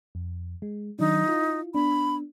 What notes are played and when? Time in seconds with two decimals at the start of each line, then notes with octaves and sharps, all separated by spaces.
0.15 F2
0.62 G#3
0.99 D#3 F#3 D4 D#4
1.27 E4 F4
1.75 B3 D4 B5